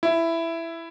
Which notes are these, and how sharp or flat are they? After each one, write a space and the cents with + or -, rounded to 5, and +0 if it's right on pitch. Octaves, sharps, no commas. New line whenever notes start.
E4 +10